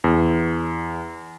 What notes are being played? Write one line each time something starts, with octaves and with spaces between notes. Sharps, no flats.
E2